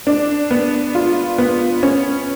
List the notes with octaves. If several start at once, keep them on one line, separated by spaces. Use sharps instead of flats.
D4
B3
F4
B3
C#4